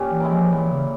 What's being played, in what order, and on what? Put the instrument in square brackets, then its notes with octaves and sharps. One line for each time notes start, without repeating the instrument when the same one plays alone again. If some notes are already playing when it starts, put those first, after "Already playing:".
Already playing: [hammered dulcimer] A#2 C#4 G4
[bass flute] E3
[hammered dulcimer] G#3 E4 A#4
[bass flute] F3
[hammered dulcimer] A#2 [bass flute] E3
[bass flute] C#3